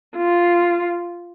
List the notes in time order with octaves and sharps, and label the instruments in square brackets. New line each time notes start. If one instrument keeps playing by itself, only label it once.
[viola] F4